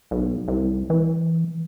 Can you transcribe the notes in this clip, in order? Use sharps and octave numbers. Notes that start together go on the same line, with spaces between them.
B1
C2
E3